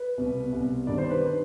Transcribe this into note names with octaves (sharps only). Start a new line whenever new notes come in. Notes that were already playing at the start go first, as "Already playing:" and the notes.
Already playing: B4
C2 B2
C2 B2
G2 D#3 D5
C5
B4
D#3